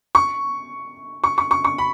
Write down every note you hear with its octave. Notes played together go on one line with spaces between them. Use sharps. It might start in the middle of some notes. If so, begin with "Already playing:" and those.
C#6
C#6
C#6
C#6
C#6
B5